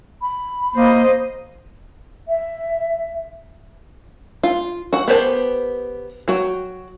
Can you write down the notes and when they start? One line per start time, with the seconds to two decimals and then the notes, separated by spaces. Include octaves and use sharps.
0.22 B5
0.76 A#3 C5 D#5
2.28 E5
4.43 F4
4.93 F#4 F#5
5.08 B3 G4 A#4 C5 A5
6.28 F#3 F#4 G5